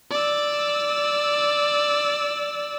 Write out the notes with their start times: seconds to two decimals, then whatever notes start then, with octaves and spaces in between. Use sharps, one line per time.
0.11 D5 E6